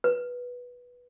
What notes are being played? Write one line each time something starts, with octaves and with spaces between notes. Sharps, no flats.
B4